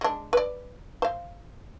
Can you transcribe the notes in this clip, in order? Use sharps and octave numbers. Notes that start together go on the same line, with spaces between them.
G#3 D4
B4 D5
C5 F5